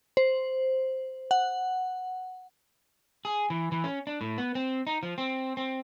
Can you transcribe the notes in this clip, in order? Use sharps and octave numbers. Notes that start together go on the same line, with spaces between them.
C5
F#5
G#4
E3
E3
C#4
D4
A2
B3
C4
D#4
F3
C4
C4